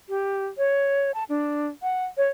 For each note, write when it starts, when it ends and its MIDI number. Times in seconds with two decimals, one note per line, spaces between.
0.09 0.46 67
0.58 1.11 73
1.14 1.24 81
1.29 1.67 62
1.82 2.04 78
2.17 2.28 73